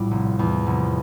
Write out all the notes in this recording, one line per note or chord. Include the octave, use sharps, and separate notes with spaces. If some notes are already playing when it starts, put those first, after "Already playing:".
Already playing: A#1 A2 G3
F1
E2
F1